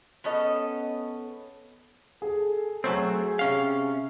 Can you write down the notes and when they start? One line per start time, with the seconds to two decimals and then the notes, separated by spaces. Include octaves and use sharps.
0.24 B3 C#4 A4 D#5
2.22 G#4 A4
2.84 F#3 A3 C4 G#4 C#5 G#5
3.39 C3 C#4 F5